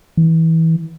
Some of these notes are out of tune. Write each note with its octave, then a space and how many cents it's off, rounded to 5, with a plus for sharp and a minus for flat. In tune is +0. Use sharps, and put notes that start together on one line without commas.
E3 -25